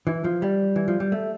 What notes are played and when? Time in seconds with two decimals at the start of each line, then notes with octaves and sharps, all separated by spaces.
0.07 E3
0.24 F3
0.42 G3
0.76 E3
0.88 F3
1.00 G3
1.12 A3